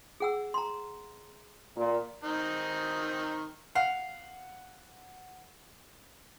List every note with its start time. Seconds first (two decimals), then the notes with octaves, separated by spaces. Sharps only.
0.20 G#4 F#5 E6
0.54 A#5 C6
1.76 A#2
2.24 D#3 C4 D#4
3.75 F5 F#5